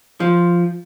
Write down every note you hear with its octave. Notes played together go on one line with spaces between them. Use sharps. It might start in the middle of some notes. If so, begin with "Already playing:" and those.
F3